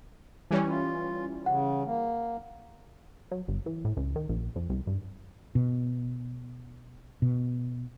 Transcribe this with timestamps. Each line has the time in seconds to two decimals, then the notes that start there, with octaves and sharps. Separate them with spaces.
0.51 E3 G3 C#4
0.69 F4
1.46 C#3 F#5
1.85 A#3
3.31 F#3
3.48 G1
3.66 E3
3.85 A2
3.97 C#2
4.16 D#3
4.29 A#1
4.56 F2
4.69 C2
4.87 G2
5.55 B2
7.22 B2